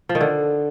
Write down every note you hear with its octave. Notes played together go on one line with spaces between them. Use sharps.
F3
D#3
D3